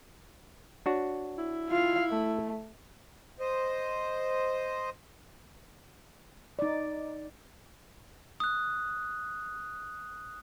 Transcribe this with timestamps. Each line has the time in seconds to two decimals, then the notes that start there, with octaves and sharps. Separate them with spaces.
0.86 D4 F#4 C#5
1.39 E4
1.69 F4 F5
2.10 A3
3.40 C5 D#5
6.59 D#4 D5
8.40 D#6 F#6